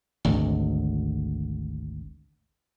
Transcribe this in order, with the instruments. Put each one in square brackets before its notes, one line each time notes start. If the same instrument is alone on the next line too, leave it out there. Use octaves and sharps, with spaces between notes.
[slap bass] G#1 D2